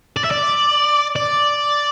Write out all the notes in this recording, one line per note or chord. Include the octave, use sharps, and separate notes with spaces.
D5
E5
D5
D5